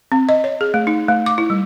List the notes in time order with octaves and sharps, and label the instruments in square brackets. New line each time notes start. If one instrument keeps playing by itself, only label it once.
[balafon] C4
D#5
C#5
G#4
A3
D#4
A3
D6
E4
G3